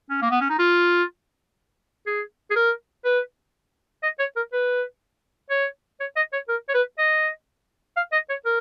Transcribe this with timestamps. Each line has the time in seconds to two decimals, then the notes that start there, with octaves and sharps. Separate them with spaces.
0.10 C#4
0.22 A#3
0.31 B3
0.40 C#4
0.50 D#4
0.59 F4
2.07 G#4
2.51 G#4
2.56 A#4
3.04 B4
4.03 D#5
4.19 C#5
4.36 A#4
4.53 B4
5.50 C#5
6.00 C#5
6.16 D#5
6.33 C#5
6.48 A#4
6.69 C#5
6.74 B4
6.98 D#5
7.97 F5
8.13 D#5
8.29 C#5
8.45 A#4